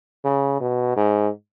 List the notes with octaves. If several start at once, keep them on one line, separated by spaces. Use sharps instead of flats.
C#3
B2
G#2